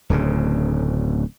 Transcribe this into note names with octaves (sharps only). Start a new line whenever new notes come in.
D1 D2 C#3